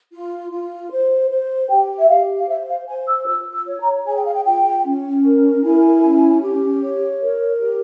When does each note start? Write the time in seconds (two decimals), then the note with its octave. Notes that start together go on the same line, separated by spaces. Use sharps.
0.12 F4
0.51 F4
0.91 C5
1.30 C5
1.69 G4 G5
1.98 E5
2.09 G4 F5
2.39 F5
2.48 C5 E5
2.68 F5
2.88 C5 G#5
3.07 E6
3.27 F4 E6
3.53 E6
3.67 C#5
3.80 A#5
4.06 G#4 G#5
4.15 G5
4.24 F5
4.34 G5
4.45 F4 G5
4.85 C#4
5.24 A#4
5.63 E4 G#5
6.03 C#4
6.42 G4
6.82 C#5
7.21 A#4
7.60 G4